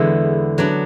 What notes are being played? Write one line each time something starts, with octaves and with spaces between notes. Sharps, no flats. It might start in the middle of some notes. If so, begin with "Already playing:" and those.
Already playing: E2 D3 G#3 B3 E4
F#3 B3 D4